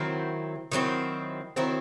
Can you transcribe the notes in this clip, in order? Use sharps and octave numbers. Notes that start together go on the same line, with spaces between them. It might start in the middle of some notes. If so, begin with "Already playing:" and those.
Already playing: D#3 F#3 C4 E4
D#3 F#3 C4 E4
D#3 F#3 C4 E4